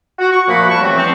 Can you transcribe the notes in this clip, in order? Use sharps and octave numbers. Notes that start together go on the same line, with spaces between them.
F#4
C#6
A#2 F3 A3 A#3 F#5 B5
C2 G3 A5 C#6
C#3 E3 A3 C4 F#4
E2 F3 A3 C4